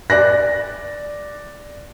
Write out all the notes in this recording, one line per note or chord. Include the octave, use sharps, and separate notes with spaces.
D5 F#6 A#6